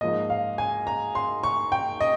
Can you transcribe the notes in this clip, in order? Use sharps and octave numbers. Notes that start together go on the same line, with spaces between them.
G#2 F3 A#3 D#5
F5
G#5
A#5
C6
C#6
G5
D#5